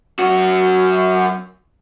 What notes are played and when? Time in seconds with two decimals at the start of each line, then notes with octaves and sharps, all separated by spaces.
0.19 F#2 F#4